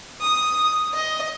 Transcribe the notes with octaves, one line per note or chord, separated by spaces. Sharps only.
D#6
D#5